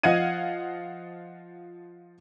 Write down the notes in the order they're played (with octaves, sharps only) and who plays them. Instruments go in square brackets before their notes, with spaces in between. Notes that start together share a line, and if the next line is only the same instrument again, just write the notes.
[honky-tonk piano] F3 D#5 F5 F#5 G#6 D#7